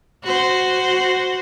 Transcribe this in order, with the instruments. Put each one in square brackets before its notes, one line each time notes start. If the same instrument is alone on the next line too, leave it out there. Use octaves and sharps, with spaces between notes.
[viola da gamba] F#4 C5